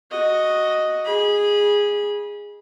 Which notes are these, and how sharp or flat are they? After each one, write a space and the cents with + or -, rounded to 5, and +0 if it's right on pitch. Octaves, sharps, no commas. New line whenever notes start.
F#4 +0 D#5 +0
G#4 -10 B5 -25